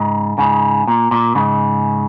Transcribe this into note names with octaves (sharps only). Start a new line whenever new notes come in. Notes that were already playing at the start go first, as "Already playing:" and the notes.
Already playing: G#2 C#3
G#2 C#3
A#2
A#2
G#2 C#3